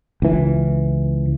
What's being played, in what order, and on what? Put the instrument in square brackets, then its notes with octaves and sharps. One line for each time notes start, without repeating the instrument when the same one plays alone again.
[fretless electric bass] C#2 E3